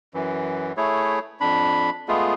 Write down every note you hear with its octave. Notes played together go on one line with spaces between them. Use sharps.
F#2 E3
A3 E4 G#4 C#5
F2 D4 B5
G#3 A3 B3 F4 G#4